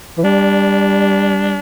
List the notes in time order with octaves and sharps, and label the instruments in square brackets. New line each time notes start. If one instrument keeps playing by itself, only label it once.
[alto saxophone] E3
[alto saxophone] G3 [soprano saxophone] D4